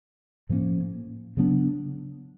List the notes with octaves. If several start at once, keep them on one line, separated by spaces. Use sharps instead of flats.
A2 F3 A#3 C#4
C#3 F#3 B3 D4